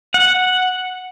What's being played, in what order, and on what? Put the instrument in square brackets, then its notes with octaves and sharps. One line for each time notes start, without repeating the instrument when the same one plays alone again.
[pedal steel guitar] F#5